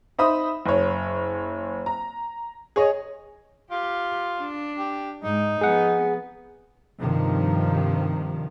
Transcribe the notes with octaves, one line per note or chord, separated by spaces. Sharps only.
D#4 C5 E5 B5 D#6
F#1 C#5
A#5
G#4 C#5 D#5
F4 G4
D4
G4
G#2 D#4
F3 B3 G#4 F#5
G2 C3 D#3 F3